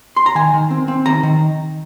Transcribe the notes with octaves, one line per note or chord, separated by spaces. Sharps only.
C6
A#5
D#3 G#5
D#3
C4
C4
D#3 A#5
D#3